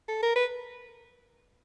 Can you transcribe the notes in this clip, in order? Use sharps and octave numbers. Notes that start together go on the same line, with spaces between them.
A4
A#4
B4